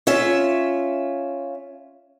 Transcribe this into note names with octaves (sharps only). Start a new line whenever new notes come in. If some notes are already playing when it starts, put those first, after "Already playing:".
C#4 F4 E5